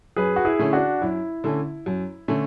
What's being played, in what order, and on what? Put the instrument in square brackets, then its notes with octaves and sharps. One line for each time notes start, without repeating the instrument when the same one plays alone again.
[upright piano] F#2 [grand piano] G#4 B4
[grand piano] F#4
E4 G#4
[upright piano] D3 A3 C#4
[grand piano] D4 F#4
[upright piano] F#2 [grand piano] E4
[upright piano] D3 A3 C#4
F#2
D3 A3 C#4